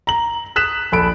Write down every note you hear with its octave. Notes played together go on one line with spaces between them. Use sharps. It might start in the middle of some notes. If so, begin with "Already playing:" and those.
A#5 F#7
D#6 F#6 B6 E7
A#1 A4 B5 D7